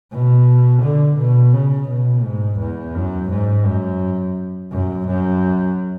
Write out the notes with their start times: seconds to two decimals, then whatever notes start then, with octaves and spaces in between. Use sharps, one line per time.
0.12 B2
0.83 D3
1.19 B2
1.53 C#3
1.89 B2
2.24 G#2
2.60 E2
2.95 F#2
3.31 G#2
3.66 F#2
4.72 F#2
5.07 F#2